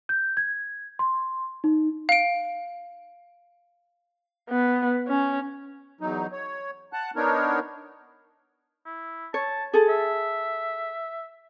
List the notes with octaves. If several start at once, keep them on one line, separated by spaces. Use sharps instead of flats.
G6
G#6
C6
D#4
F5 D7
B3
C#4
E2 F#3 D#4
C#5
F#5 A5 F#6
B3 D4 D#4 A#4 C#5
E4
C#5 A5
G#4 A4 A5
E5